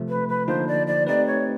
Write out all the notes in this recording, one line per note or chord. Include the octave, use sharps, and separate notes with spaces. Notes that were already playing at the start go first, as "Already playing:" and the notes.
Already playing: C3 F3 A3
B4
B4
D3 F3 A#3 D#4 C5
D5
D5
A3 C4 D#4 G4 B4 D5
C#5